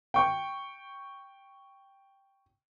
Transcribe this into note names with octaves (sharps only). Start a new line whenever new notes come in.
G5 C#6